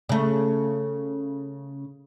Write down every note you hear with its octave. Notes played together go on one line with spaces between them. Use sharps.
C#3 A3